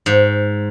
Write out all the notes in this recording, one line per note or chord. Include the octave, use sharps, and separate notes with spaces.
G#2